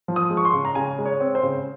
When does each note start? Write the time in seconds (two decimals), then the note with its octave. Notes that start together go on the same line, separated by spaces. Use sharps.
0.08 F3
0.16 D#6
0.30 G#3
0.37 C#6
0.45 C6
0.53 C#3
0.65 A#5
0.75 C#3 G#5
0.98 G#3
1.05 C#5
1.20 C4
1.35 C5
1.43 C#3